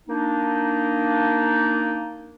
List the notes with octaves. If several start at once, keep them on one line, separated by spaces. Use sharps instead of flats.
A#3 D4 D#4